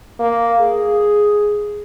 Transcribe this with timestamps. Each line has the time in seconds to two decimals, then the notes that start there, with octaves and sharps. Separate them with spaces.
0.19 A#3
0.60 G#4